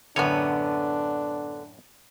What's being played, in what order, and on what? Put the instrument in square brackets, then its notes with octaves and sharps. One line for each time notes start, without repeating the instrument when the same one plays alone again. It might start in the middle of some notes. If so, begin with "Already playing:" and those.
[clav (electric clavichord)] F#2 A2 C#5 [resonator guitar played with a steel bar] D3 B3 [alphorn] D4